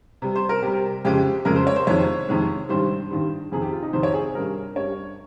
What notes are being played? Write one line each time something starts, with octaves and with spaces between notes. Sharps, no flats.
C3 G3
C5
A#4
C3 G3 G4
F2 C#3 G#3 G4
F2 C#3 G#3 A#4
C5
C#5
C5
F2 C3 D#3 G#3 C#5
F2 C3 D#3 G#3
G2 D#3 G3 C5
G2 D#3 G3
F2 C3 D#3 G#4
G4
F4
D#4
F2 C3 D#3 C5
C#5
G#4
G#4
G2 G3 A#4
G2 G3 C#5